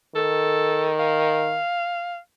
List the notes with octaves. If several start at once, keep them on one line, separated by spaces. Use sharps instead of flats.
D#3 A4
F5